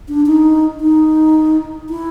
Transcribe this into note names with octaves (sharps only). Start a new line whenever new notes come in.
D4
D#4
D#4
E4